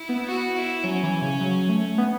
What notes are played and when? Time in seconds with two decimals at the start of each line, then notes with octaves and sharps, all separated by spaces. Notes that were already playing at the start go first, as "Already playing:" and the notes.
Already playing: E4
0.09 B3
0.27 F#4
0.56 E4
0.84 F#3 C#4
1.03 E3
1.22 C#3
1.40 F#3
1.69 A3
1.98 B3